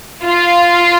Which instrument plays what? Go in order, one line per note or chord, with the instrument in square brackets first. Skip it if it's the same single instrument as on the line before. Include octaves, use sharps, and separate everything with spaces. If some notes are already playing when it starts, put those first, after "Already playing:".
[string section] F4